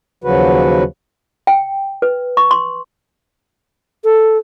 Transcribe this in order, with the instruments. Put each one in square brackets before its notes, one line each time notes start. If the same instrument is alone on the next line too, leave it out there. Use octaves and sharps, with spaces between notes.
[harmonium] D#2 C#3 F3 F#3 F#4 B4
[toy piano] G5
B4
C#6
C6
[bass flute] A4